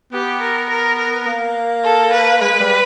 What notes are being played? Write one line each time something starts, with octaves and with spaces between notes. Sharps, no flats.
B3 G4
A#4
A#4
A#4
A#3
A4
B4
G#3 B4
G3